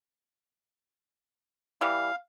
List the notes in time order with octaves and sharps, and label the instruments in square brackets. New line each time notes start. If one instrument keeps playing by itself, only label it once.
[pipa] E3 G3 [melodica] F5